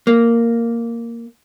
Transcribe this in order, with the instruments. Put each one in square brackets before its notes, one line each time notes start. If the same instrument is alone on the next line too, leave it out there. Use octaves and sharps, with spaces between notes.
[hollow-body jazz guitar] A#3